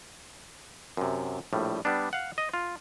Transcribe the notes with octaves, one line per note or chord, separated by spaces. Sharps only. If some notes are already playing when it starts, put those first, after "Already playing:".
F#2 C3
A#1 A2 G3
G3 B3 D4
F5 F#5
D#5
F4